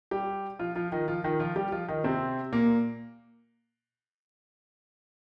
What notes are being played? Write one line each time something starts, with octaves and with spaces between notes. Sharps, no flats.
G3 G4
F3 F4
F3 F4
D#3 D#4
F3 F4
D#3 D#4
F3 F4
G3 G4
F3 F4
D#3 D#4
C3 C4
A#2 A#3